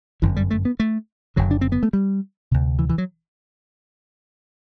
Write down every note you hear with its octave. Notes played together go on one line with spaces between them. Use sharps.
G1 F#2 D3 E3
G3
A3
B3
A3
F#1 F#2 D3 F#3
D4
C4
B3
A3
G3
D2 C3
E3
E3
F#3